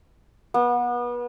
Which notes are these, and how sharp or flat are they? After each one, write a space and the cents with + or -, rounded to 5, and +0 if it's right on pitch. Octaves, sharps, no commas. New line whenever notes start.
B3 -30